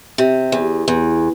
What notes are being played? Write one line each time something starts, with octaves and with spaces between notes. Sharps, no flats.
C3
E2
E2